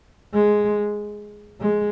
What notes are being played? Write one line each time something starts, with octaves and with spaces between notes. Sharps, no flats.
G#3
G#3